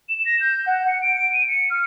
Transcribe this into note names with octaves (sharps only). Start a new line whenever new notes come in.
E7
A#6
G6
F#5
C#7
D7
D7
D#7
C#7
F6